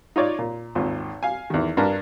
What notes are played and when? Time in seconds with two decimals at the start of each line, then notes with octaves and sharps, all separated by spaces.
0.16 D#4 F4 C#5 D5
0.39 A#2
0.75 G#1 D#2 F4
1.23 F5 G#5
1.50 E2 D#3
1.77 G2 D4 A#4 A#5